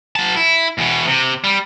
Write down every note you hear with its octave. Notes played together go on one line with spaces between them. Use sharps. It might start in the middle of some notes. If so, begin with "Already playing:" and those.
F#3 A5
E4
E2 B2
C3
G3